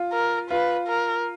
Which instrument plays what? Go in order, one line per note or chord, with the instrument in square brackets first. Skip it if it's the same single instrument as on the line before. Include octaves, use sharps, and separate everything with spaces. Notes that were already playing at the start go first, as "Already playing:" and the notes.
Already playing: [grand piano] F4
[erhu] A#4
[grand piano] F4 [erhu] B4
[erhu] A#4